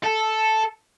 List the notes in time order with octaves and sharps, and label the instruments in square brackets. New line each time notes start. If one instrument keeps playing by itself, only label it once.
[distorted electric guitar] A4